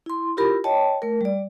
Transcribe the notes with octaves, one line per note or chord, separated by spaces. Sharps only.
E4 C6
E4 F4 G4 A#4 B5
C#5 D#5 G5 A5
A3 A#4
G3 D5